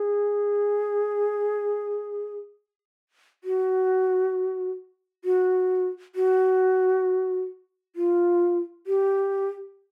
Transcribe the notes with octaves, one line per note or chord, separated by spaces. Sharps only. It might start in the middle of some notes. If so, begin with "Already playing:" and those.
Already playing: G#4
F#4
F#4
F#4
F4
G4